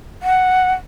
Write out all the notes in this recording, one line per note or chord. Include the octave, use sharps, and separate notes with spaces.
F#5